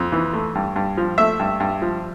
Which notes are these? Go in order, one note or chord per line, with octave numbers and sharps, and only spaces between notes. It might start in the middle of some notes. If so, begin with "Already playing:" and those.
Already playing: F2
E3
A3
G2
G2
F3
A3 E5
G2
G2
F3